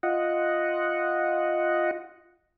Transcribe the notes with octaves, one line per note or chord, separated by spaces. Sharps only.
F4 D#5 F#5